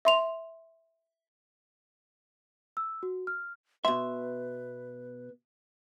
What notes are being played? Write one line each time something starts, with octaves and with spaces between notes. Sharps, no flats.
E5 C6 F7
E6
F#4
F6
B2 B4 E5 C6